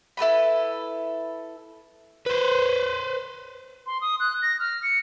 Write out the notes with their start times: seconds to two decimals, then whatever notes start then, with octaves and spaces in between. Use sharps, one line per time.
0.17 E4 A4 B4 B5
2.26 B4 C5
3.86 C6
4.01 D#6
4.20 F#6
4.42 A#6
4.60 F6
4.83 C#7